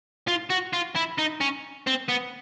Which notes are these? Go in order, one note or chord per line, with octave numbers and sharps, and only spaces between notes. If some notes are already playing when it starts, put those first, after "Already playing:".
F4
F#4
F4
E4
D#4
C#4
C4
B3